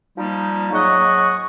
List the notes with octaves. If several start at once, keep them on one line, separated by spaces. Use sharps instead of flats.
F3 G3 A#3 D#4
G#2 F#3 D#5 F#5 C#6